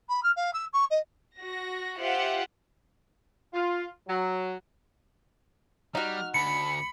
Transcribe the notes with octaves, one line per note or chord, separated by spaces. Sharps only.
B5
F6
F5
E6
C#6
D#5
F#4 A#6
F4 G4 C5 E5 F#5
F4
F#3
G3 D#4 F#4 F6
D2 B5 C#7